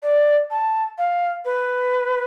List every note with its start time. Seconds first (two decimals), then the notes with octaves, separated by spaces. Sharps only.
0.03 D5
0.50 A5
0.98 F5
1.45 B4